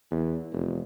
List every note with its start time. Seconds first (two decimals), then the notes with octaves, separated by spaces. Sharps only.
0.11 E2
0.52 F1